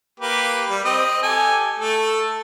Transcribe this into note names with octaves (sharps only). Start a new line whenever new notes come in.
A#3 G4 B4
G3
C4 D#5
G4 A4 G#5
A3 A4